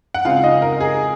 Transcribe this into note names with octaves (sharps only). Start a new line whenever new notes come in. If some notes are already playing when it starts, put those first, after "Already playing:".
F#5
C#3 G#3 C4 F4 F5
D#4 D#5
A#4
G#4